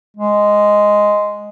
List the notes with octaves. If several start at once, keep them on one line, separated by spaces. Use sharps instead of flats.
G#3